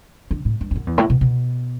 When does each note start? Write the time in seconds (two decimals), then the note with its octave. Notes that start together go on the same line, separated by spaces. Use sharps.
0.31 D3
0.45 A2
0.61 G2
0.71 E2
0.76 F#2
0.87 E2
0.98 A2
1.10 B2
1.21 B2